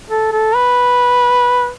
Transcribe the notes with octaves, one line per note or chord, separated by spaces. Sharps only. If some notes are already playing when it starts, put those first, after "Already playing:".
A4
A4
B4